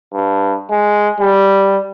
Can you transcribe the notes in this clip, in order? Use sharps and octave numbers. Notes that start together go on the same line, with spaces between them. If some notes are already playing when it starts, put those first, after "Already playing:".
G2
G#3
G3